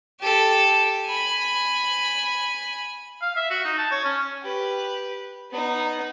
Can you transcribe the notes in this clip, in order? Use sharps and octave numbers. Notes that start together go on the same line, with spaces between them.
G4 A4
G#5 B5
F5
E5
F#4
D#4
A5
C#5
C#4
G4 B4
B3 D#4